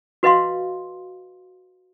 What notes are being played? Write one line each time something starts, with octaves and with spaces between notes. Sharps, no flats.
F#4 B4 D#5 F5 C6